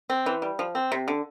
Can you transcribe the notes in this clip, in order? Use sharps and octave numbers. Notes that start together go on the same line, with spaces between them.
C4
E3
G3
F3
C4
C3
D3